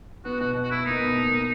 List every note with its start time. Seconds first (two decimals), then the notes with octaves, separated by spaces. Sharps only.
0.25 B3 F#4
0.40 B2 F#4
0.55 B2
0.64 F#4
0.71 B3 E4
0.86 A#3 D#4
1.01 B2
1.17 A#3
1.32 A#3